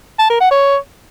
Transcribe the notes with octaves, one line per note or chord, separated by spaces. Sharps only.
A5
A#4
F#5
C#5